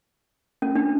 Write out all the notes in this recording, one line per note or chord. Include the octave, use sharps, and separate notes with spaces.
C#4
D4